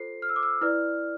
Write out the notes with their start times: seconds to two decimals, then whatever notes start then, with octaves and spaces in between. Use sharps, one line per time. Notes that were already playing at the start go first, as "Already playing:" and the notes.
Already playing: F4 A4 C5 C7
0.22 F6
0.29 E6
0.36 D6
0.43 E6
0.61 E4 B4 D5 F6